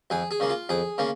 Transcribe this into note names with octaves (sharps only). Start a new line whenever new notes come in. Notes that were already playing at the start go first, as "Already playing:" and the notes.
F2 G#4
G#4
C#3 A#3
F4
F2 G#4
C#3 A#3